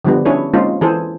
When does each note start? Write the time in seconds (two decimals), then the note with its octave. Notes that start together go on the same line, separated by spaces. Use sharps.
0.04 D3 F3 G3 B3
0.25 C#4 D4 E4 G#4 B4 C#5
0.54 G#3 A#3 C4 C#4 D#4 F4
0.81 E3 G#4 A4 C5